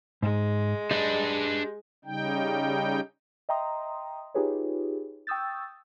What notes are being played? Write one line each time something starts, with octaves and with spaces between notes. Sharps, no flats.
G#2 G#3
D4 G4 B4 D#5
C#3 G3 D#4 G5
D#5 E5 G5 A#5 C6 D#6
D#4 F4 G4 G#4 B4 C#5
G5 C#6 D#6 E6 G6 A6